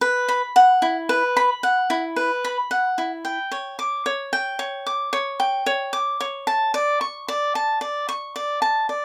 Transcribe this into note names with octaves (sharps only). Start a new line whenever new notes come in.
B4
B5
F#5
E4
B4
B5
F#5
E4
B4
B5
F#5
E4
G5
C#5
D6
C#5
G5
C#5
D6
C#5
G5
C#5
D6
C#5
A5
D5
C#6
D5
A5
D5
C#6
D5
A5
D5